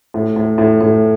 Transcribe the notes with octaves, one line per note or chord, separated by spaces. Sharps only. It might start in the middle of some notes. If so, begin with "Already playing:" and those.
A2
A2
A2
A2